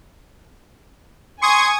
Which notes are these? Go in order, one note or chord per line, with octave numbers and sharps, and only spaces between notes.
G#5 C6 C#6 D#6 G#6